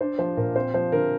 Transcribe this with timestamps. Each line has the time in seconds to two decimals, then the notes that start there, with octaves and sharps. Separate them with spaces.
0.01 D4 C5
0.19 F3 C5
0.37 A#2 A#4
0.56 C4 C5
0.74 F3 C5
0.92 D3 A#4